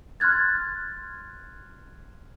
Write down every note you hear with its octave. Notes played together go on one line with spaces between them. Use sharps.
C6 F6 F#6 G#6 A6